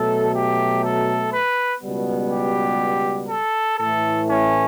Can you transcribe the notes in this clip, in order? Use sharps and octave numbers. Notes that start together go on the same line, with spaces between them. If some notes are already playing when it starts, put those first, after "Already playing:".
Already playing: B2 F#3 A3 A4
G4
A4
B4
C#2 B2 G3 B3
G4
A4
A2 E3 A3 A4
C#4